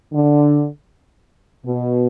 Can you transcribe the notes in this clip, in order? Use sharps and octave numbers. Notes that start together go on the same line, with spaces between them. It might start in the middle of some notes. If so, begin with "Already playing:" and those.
D3
B2